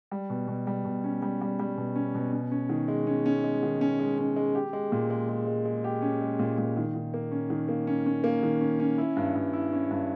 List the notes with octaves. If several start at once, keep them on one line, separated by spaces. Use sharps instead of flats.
G3
B2
B2
G3
B2
C#4
G3
G3
G3
B2
C#4
B2
C#4
C#4
D#3
G#3
C#4
C#4
G#3
D#3
C#4
G#3
C#4
G#3
G4
G#3
A#2
G#3
G#3
G#3
G#3
G4
C#4
G#3
A#2
A#2
D#3
D#3
A#3
C#4
D#3
A#3
C#4
C#4
A#3
D#3
C#4
C#4
E4
G2
G2
E4
C#4
G2